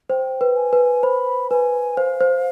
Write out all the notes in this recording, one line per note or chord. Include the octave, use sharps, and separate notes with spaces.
C5 G5
B4
G#5
B4
C5 B5
B4 G#5
C5 F5
C5